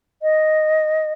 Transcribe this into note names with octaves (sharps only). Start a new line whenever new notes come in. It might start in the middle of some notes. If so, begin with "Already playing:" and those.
D#5